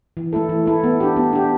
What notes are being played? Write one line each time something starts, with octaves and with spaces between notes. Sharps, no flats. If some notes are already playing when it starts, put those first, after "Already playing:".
E3
A3 E4 A4
E3
A3 E4 A4
B3
D4 G4
B3
D4 G4